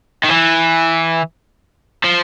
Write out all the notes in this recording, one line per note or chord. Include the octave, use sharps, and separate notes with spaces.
D#3
E3
F3